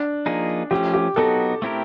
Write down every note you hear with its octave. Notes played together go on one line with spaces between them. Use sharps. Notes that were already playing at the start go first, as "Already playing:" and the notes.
Already playing: D4
F3 A#3 D#4 G#4
F3 A3 C#4 G4
G4
F#3 B3 D#4 F#4 A4
A3 C4 E4 G4 A#4